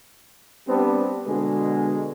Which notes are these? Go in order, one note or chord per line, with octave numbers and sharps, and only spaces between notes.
G3 B3 C4 D4
B2 D3 G#3